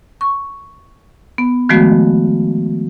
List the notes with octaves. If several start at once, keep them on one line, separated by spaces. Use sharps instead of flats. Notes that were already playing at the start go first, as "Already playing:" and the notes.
C#6
B3
D#3 F3 G#3 A3 B3 F#4